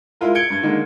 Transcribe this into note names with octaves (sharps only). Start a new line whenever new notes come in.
G#3 E4 F4 A#4
G#6 C#7 D7 G7
G2 G#6
D3 D#3 G#3 A#3